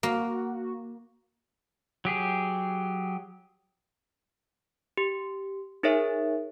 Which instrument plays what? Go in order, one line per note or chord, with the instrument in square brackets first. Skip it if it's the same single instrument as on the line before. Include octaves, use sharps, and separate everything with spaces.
[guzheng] A#3 [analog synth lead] F#4
[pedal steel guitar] F#3 G4 G#4
[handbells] G4
D#4 G#4 A#4 C#5 E5